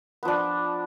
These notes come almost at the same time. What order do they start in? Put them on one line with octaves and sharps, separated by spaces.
B3 F3 D4